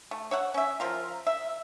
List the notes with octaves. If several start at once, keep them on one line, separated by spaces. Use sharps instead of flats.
A3
C#5 E5 F#5
C#4 E5
F3 F4 A#4
E5